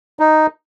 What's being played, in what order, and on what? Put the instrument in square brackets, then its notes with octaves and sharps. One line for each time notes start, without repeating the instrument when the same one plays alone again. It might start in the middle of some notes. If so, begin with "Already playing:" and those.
[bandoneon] D#4